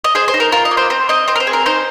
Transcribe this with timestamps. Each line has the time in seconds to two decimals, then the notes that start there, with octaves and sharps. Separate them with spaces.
0.04 D#5
0.15 G#4 C5
0.28 C5
0.34 D#4
0.40 A#4
0.52 F4 A#4
0.65 D#5
0.71 A#3
0.77 C5
0.90 C4 C5
1.09 C4 D#5
1.28 C4 C5
1.36 A#4
1.40 C5
1.47 G#4
1.53 A#4
1.66 D#4 C5